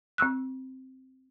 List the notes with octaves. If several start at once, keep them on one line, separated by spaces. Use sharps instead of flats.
C4 C#6 E6 F#6